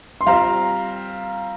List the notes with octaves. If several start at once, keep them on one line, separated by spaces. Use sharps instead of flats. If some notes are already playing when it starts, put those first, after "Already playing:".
C6
G3 C4 F4 F5 A#5